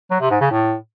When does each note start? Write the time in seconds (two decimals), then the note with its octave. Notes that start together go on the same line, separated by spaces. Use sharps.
0.11 F#3
0.21 C3
0.31 G#2
0.41 C#3
0.50 A2